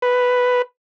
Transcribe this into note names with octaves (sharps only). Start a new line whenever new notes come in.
B4